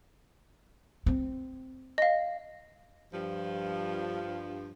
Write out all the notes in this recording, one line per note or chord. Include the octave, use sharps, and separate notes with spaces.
C4
D#5 F5
G2 F3